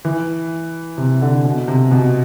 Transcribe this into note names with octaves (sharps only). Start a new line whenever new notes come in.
E3
C3
D3
B2
C3
B2